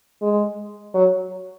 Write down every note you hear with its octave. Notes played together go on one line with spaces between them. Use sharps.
G#3
F#3